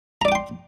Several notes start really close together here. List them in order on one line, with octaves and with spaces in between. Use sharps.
A#5 D5 D6 G5 C6